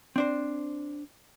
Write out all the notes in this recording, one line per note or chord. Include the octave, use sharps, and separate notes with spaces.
C4 D4 C5